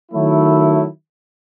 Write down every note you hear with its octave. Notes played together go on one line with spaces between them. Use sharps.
D#3 F#3 A3 E4